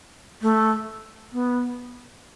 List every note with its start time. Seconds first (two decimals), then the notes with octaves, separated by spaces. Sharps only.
0.42 A3
1.33 B3